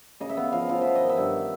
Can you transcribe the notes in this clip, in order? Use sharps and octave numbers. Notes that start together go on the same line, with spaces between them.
C#3 D#5
E5
B3 F5
F3 F5
F3 F5
B3 E5
D#5
D#3
E5
G2